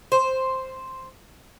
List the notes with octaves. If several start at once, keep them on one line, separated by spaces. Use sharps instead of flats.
C5